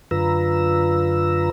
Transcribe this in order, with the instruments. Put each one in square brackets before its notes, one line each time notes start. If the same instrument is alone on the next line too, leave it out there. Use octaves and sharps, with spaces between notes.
[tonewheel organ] F#2 D3 F4 B4 A#5 E6